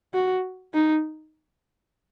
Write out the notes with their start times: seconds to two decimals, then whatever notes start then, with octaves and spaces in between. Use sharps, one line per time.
0.14 F#4
0.74 D#4